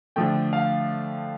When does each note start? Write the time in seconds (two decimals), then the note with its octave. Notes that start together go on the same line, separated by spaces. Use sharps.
0.16 D3 F3 A3 G5
0.53 F5